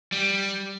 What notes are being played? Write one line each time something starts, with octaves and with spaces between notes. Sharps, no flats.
G3